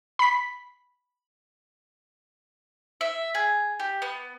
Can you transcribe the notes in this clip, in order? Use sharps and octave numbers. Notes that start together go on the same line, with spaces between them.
B5 B6
E5
G#4
G4
B3